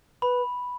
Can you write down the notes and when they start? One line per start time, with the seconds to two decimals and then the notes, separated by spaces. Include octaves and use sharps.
0.22 B4 B5